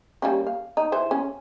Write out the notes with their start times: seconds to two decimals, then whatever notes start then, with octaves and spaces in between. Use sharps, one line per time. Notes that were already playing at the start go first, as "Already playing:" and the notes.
0.22 G3 A#3 C#4
0.47 F5
0.77 D#4
0.92 E3 C5
1.11 C#4